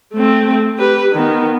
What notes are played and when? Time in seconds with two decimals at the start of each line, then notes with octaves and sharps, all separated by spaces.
0.14 A3 C4
0.79 G4 B4
1.13 D#3 B3